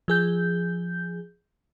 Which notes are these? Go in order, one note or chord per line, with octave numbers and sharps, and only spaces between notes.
F3 G#4 G6